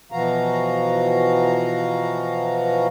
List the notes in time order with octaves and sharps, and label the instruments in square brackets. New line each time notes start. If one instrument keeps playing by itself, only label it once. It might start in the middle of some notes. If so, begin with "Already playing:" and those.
[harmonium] B2 E3 F3 F#4 F5 A#5